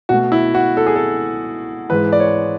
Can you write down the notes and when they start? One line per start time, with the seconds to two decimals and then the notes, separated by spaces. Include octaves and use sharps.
0.09 B2 A3 F#4
0.32 E4
0.54 F#4
0.77 A4
0.86 G#4
0.96 A4
1.90 G#2 E3 G#3 B4
2.13 D5
2.20 C#5